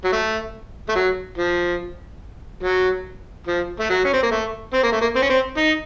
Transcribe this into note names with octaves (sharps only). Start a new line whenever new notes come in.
F#3
A3
A3
F#3
F3
F#3
F3
A3
F#3
C#4
C4
A#3
A3
C4
A#3
A3
A#3
C4
C#4
C4
D#4